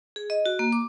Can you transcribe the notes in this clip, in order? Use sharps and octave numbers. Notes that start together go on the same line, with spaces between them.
G#4
D#5
F#4
A#3
D6